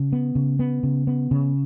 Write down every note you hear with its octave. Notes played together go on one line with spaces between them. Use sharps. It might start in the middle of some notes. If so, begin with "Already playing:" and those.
Already playing: C#3
B3
C#3
B3
C#3
B3
C#3